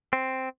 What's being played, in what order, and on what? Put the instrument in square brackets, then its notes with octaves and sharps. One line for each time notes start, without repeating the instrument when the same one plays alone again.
[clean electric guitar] C4